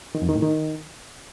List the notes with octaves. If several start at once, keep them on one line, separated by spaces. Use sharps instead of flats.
D#3
F2
D#3
A2
D#3